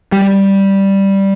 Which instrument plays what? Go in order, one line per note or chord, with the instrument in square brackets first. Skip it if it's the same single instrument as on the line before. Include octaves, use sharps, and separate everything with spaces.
[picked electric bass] G3